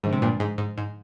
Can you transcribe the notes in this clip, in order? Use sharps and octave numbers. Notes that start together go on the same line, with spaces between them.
G#2 D3 F3 G#3 D4
C3
G2 A#2
G#2
G#2
G#2